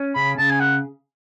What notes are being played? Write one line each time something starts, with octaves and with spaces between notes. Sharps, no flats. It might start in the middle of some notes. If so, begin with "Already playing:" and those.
Already playing: C#4
C#3 B5
C#3 A5
G#5
F#5